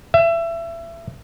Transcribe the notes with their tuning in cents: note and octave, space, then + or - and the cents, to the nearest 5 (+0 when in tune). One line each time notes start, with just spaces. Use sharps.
E5 +25